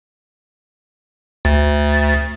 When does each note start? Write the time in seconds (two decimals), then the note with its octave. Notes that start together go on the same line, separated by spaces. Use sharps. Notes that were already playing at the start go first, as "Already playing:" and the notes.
1.45 D2 A6